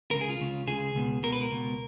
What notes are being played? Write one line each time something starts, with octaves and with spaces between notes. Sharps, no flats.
C#2 C#3 A#4
G#4
F4
C#2 C#3
C#2 C#3 G#4
C#2 B2
C#2 B2 A#4
B4
A#4
C#2 B2